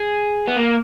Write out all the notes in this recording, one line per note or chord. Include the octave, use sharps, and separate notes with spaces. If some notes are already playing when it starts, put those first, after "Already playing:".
Already playing: G#4
B3
A#3